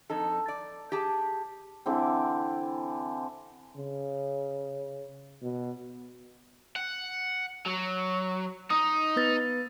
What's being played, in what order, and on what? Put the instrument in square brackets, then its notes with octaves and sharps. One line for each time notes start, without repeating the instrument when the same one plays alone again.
[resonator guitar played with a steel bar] F2 D#4 A4
D5
G4 G#4 A5
[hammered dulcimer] D3 E3 C4
[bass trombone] C#3
B2
[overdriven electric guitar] F#5
F#3
[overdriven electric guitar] D#4 [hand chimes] D#6
[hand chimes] B3 B4 A6